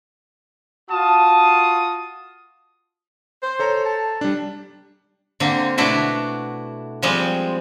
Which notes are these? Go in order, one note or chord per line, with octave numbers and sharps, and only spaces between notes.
F4 F#4 A5 D#6
C5
A4 C#5 A#5
A5
G3 D4
D3 A#3 C4
B2 A3 D4 E4 F#4
F3 G3 G#3 C4